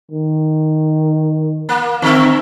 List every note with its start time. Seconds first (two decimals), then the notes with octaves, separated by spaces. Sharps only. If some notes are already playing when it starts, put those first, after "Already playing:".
0.11 D#3
1.69 A#3
2.02 D3 C4 A#4 E5